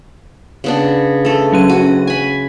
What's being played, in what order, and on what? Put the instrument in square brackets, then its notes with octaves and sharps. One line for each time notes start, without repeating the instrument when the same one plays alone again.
[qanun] C#3 B3 D4
A3 A4
[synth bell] F#3 C#4 D#7
[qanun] F#4
G#5 B5